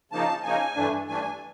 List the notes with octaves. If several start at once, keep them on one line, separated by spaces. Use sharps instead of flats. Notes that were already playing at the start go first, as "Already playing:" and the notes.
C#3 F3 A#3 D#4 A5
C#3 F3 A#3 D#4 G#5
G2 E3 A3 D4
G2 E3 A3 D4 G#5